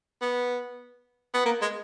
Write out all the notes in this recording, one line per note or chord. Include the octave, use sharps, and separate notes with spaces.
B3
B3
A#3
G#3